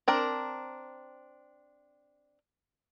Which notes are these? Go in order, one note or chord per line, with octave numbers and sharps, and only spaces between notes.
C4 D4 A#4